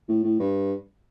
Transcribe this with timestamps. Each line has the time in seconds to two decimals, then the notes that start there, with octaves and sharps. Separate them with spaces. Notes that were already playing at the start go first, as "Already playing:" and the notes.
0.08 A2
0.24 A2
0.39 G2